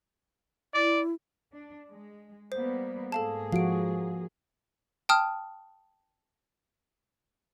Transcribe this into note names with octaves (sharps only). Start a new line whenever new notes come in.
E4 D5
D4
G#3
G3 A#3 B3 C5
G#2 A#3 G#4 A4 F5 A5
F3 F#4 F5 D7
G5 A5 D#6 F6